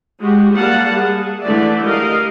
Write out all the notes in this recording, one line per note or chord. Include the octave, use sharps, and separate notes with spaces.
G#3 F#4 G4
G3 A#3 F5 F#5 A5
G#4
D3 E3 A3 D5 E5
G4 A#4 D#5 F5